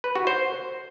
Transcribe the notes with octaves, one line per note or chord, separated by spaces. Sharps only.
B4
F#4
C5